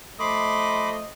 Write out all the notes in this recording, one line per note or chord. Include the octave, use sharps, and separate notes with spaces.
F3 A3 D#5 B5 C6 D6